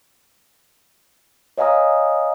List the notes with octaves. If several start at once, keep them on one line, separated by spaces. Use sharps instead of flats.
C#5 D#5 F5 G#5 A#5 D#6